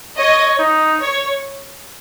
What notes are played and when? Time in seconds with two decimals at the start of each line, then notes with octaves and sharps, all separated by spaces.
0.18 C#5 D#5
0.58 D#4
0.99 C#5